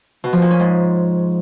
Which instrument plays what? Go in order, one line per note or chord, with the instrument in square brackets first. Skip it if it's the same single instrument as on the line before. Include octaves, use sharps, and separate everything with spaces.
[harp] B2
F3
A#2
C#4
G#2